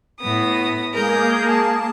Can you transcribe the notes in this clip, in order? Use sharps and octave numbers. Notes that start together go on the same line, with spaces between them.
A2 B3 D#6
G#3 A#3 G#4 A#4 G6
A5